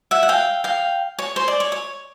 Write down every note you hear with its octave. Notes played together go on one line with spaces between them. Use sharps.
E5 F#5
F#5
F5 G5
F5 G5
C#5
C5
D5
C#5
C#5